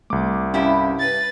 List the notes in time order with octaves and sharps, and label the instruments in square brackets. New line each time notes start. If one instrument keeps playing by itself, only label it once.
[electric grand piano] C2 D6 [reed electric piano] A3
[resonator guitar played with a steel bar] G2 E4 G4 [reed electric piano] C#4 F5
[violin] B4 A6